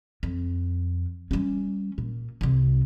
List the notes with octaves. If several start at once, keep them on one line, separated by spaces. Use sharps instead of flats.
F2
G3 C#4
A#2
C2 C3